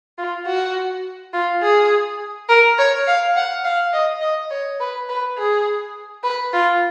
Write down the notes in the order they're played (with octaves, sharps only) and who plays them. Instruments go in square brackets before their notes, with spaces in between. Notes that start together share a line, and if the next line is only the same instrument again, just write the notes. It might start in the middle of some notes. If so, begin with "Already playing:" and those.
[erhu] F4
F#4
F4
G#4
A#4
C#5
F5
F#5
F5
D#5
D#5
C#5
B4
B4
G#4
B4
F4